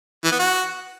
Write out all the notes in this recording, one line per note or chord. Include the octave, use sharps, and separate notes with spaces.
E3
B3
F#4